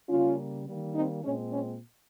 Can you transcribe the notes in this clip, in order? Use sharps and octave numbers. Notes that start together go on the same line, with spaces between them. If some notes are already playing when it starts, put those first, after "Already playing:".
C#3 G3 A#3 C#4 F4
D#3 G3 A#3
C4 D#4
A#2 G#3 C4 C#4
C#4